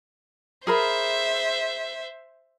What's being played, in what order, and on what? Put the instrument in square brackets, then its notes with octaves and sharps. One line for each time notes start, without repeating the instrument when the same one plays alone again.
[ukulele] G#4 A#4 B5 [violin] C5 E5